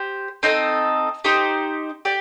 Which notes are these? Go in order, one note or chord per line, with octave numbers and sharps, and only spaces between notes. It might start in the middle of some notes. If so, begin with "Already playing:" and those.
Already playing: G4 C5
C4 D#4 A4 D#5
D#4 G4 C5
G4 D5